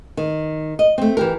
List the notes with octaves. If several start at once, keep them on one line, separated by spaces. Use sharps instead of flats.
D#3
D#5
A3 C4
E3 G4 A#4